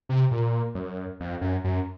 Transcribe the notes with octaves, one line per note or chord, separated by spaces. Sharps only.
C3
A#2
F#2
F2
F#2
F#2